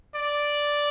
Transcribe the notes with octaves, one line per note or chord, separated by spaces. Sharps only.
D5